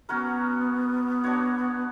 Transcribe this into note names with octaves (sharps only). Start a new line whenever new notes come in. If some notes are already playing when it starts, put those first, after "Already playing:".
F#3 B3 C#4 F#4 A#4
D4 F#4 C#5